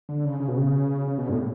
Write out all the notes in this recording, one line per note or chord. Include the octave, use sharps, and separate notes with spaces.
D3
C#3
C#3
B2
C#3
C#3
B2
G2
A2